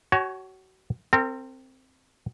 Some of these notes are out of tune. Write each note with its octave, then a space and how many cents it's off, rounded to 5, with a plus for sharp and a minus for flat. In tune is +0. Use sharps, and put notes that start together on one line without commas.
F#4 +30 C#5 +0 G#5 +40
C4 +0 A#4 -40